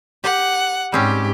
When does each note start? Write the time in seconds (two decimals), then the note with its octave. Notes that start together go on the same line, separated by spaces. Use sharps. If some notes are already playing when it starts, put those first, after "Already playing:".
0.24 G4 F#5
0.92 G#2 G3 C4 C#4 G4